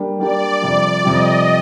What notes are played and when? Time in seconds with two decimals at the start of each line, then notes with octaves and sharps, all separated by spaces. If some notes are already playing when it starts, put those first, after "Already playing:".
Already playing: G3 A#3 D4 G4
0.19 G3 A#3 D4 G4 D5
0.62 F2 C3 G3
1.05 F2 C3 G3 D#5